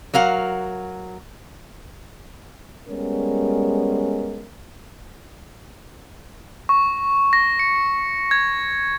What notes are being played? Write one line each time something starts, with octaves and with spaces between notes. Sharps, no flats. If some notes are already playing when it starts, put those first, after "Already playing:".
F#3 A#4 F5 F#5
G3 G#3 B3 C#4 A#4
C#6
A#6
C#7
G#6